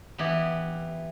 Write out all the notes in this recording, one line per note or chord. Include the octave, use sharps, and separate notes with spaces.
E3 B3 E4 G4